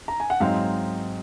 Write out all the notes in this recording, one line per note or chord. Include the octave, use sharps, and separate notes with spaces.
A#5
G#5
F#5
G#2 F#3 C4 D#4 F5